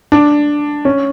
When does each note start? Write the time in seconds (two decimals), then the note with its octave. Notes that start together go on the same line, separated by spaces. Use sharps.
0.12 D4
0.85 C#4